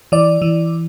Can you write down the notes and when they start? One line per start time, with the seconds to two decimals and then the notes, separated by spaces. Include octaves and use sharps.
0.12 E3 D5
0.42 E3